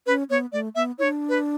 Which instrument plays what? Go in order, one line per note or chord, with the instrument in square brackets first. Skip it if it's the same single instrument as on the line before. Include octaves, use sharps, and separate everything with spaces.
[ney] C#4 [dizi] B4
[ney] B3 [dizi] C#5
[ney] A3 [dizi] D5
[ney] B3 [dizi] E5
[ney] D4 E4 [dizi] C#5
[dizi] B4